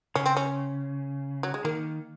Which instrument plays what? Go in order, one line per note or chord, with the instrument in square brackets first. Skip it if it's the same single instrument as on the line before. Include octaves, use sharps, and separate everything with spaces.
[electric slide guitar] C#3 [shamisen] C#4
[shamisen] C4
C#4
F#3
G#3
[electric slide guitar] D#3 [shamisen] A#3